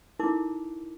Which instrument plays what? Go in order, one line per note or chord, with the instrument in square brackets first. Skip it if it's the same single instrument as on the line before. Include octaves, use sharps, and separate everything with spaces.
[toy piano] D#4 E4 A4 A#4 D6